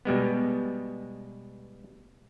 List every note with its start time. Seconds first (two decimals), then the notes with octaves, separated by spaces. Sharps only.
0.05 B2 G3 G#3 B3